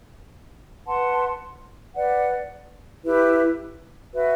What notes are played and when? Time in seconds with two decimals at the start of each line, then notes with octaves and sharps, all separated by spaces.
0.86 B4 F#5 A5 C6
1.95 B4 D5 F#5
3.04 E4 G4 B4
4.12 F#4 B4 E5